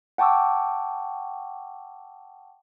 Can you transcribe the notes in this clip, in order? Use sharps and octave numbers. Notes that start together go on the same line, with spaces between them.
F#5 G5 A5 C#6 D6 E6